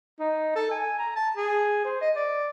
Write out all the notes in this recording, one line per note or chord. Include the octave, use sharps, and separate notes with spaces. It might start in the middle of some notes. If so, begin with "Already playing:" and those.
D#4
A4
G#5
A#5
A5
G#4
C5
D#5
D5